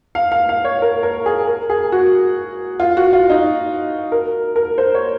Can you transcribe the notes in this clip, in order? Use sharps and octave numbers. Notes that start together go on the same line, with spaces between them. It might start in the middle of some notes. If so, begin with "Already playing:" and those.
F5
F5
F5
C#5
A#4
A#4
G#4
A#4
G#4
F#4
F4
F#4
F4
D#4
A#4
A#4
C5
C#5